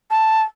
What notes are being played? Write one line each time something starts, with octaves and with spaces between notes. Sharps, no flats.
A5